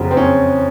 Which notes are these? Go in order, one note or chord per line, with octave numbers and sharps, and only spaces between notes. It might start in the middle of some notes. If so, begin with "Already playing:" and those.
Already playing: F#1 F2 C#3 F#3 C4
C4
C#4